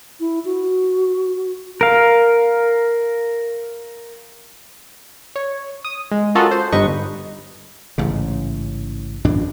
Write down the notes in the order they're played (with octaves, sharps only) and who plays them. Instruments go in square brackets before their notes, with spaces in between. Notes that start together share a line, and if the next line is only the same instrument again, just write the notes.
[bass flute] E4
F#4
[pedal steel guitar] A#4 F5
[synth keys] C#5
D#6
G#3
C#4 F4 F#4 A4 A#4 D#5
C5
G1 G2 D#4 B4 D#5 C#6
[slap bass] A1 G#2 C#3
A1 F#2 A2 D4